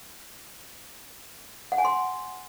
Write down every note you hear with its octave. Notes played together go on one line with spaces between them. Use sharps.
F#5
G#5
C6